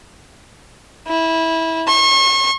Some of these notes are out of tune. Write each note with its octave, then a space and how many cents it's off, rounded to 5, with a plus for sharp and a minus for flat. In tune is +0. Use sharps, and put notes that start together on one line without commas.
E4 -20
C#6 -40